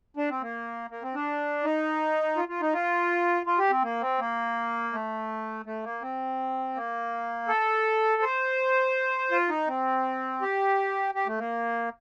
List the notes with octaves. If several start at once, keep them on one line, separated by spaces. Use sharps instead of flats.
D4
C4
A#3
A#3
C4
D4
D#4
F4
F4
D#4
F4
F4
G4
C4
A#3
C4
A#3
A3
A3
A#3
C4
A#3
A4
C5
F4
D#4
C4
G4
G4
A3
A#3